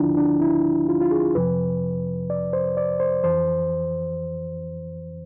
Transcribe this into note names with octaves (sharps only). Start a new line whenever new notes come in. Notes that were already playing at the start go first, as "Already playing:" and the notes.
Already playing: D2 D3 F3 D4 E4 F4
D4
E4
F4
F4
G#4
F2 C3 F3 B4
D5
C5
D5
C5
F2 E3 C5